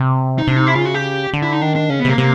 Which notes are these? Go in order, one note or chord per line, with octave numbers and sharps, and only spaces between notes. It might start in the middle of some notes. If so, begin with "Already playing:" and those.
Already playing: C3
D#4
C3 D4
D#4
E4
C#3 F4
F#4
G4
D3
E4
D#4
D#3 D4
D4
C#3 C#4
B3
C3 A#3
C3 A#3